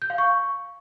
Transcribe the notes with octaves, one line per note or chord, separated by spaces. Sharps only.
G6
F5
C#6